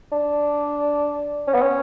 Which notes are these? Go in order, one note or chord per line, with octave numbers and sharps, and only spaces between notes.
D4
C#4
B3
C#4